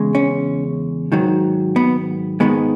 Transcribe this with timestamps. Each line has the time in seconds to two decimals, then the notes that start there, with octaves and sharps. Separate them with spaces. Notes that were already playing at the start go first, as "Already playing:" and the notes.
Already playing: E2 C#3 G#3
0.15 C#4
1.12 G#2 D#3 F#3
1.76 B3
2.40 G#2 D#3 G#3 B3